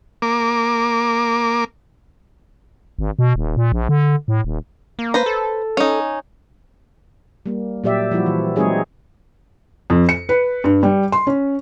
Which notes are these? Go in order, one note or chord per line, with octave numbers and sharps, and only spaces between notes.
A#3 D6
G#1
B2
D#1
A#2
A#1
D3
A2
D#1
A#3
B4 C5 A#5
A4
C#4 D#4
G3 A#3
A#2 F#3 G4 D5 E5
F3 G3 E4 F#4
E3
F#3 G#3 C4 D#4 G#4 C#5
F2
C#7
B4
G2
G3
C6
C#4